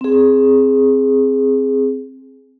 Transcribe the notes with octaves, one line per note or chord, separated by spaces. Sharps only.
C4 G#4